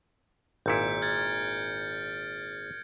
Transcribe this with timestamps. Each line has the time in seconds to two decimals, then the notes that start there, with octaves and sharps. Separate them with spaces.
0.66 G#1 A#2 E4 G6 C#7 D7
1.02 F6 G#6 A6